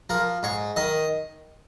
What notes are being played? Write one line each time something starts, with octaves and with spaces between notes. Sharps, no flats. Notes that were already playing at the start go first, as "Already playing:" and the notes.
F3 A#4
G#2 C#5
D#3 D#5